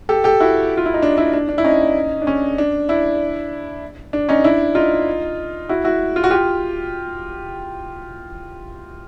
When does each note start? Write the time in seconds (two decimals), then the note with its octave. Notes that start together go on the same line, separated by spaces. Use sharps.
0.09 G4 A4
0.24 G4 A4
0.40 E4 F#4
0.77 F4
0.86 E4
0.94 D#4
1.02 D4
1.18 D4 E4
1.34 D4
1.49 D4
1.58 E4
1.64 C#4 D#4
2.22 D4
2.27 C#4
2.58 D4
2.89 D4 E4
4.13 D4
4.29 C#4 D#4
4.44 D4 E4
4.75 D#4 F4
5.69 E4 F#4
5.84 E4 F#4
6.16 F4
6.24 F#4
6.31 F4 G4